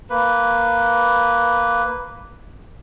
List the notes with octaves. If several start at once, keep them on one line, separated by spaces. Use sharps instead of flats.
A#3 B4